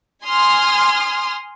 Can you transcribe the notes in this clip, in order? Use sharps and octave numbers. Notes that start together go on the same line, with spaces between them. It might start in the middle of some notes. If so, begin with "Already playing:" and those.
G#5 C6 D#6 F6